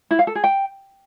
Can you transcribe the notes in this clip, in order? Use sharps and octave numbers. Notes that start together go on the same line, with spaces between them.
E4
F5
A4
G#4
G5